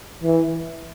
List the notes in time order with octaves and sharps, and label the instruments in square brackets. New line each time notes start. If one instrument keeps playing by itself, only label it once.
[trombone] E3